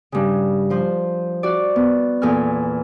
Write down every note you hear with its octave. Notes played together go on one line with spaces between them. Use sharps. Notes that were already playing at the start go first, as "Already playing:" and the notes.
G2 C#3
F3 C5
F#4 D5
B3
E2 A#2 A4 A#4 G#5 F6